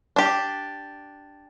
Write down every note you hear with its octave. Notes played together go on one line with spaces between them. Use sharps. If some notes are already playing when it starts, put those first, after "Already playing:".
D4 G4